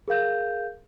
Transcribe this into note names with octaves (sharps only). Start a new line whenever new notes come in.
G#4 A#4 F5 G6